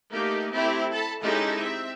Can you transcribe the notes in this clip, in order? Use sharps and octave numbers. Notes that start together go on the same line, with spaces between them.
A3 A#3 D#4 G4
A3 C4 E4 G4
A4 A5 B5
G#3 C#4 D#4 E4 G4 A4
C4 E5